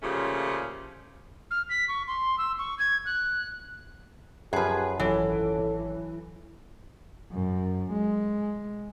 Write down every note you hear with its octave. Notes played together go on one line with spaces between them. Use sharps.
A#2 C#3 F3 A3 C#4 G4
F6
B6
C#6
C6
E6
C#6
G#6
F#6
F#2 F3 G4 G#4 B4 F#6 G#6 C7
G#1 E3 F#3 A4 C#5
F#2
G#3